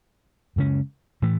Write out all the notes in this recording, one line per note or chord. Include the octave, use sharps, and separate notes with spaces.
F#2 C#3 G#3 C#4
A2 E3 A3